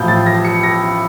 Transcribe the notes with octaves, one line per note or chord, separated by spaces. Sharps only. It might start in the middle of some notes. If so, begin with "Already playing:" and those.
Already playing: A1 A2 F3 G6
A6
A#6
C#7
A#6